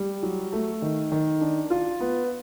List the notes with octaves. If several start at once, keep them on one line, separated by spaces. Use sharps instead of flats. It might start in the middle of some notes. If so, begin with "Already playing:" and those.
Already playing: G3
F#3
A3
D#3
D#3
D4
F4
B3